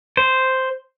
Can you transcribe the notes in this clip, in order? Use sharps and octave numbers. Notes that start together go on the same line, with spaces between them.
C5